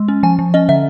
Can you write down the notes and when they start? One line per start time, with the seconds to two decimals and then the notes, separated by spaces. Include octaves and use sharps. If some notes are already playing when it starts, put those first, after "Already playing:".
Already playing: G#3
0.08 C#4
0.23 F3 G#5
0.39 F3
0.54 C#4 D#5
0.69 D3 E5